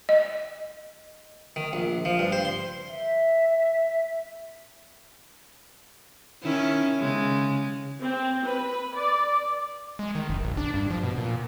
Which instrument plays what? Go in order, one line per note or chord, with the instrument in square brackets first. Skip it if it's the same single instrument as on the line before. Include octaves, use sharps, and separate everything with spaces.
[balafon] D#5
[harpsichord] D#3
A#1
F3
G2
C5
C6
[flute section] E5
[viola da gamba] D#3 C#4 E4
C#3 G#3
[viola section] C4
B4
D5
[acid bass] G#3
D#3
F#1
A#1
D4
G2
F3
B2
A#2